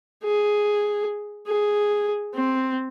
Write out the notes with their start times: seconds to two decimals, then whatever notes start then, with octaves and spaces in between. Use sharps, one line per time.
0.24 G#4
1.47 G#4
2.34 C4